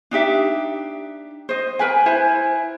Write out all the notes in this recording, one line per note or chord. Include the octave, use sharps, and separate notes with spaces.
D4 D#4 G4 E5
C5 D#5
A#4 B4 G#5
E4 C5 G#5